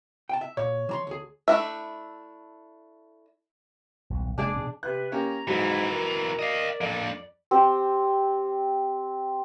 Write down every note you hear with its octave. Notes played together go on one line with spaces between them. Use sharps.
G5 A5
E5
A#2 C#5
E3 A#5 C6
D2 G#4
A3 D4 E4 E5
D#1 B1
F1 G#3 A#3 D4 G#4 D5
B2 E3 C4
C3 B4 F#6
A#3 C#4 G4 A#5
F2 G#2 E3 F#3
A#4
D5 D#5 F5
F2 A#3 D4
C4 G4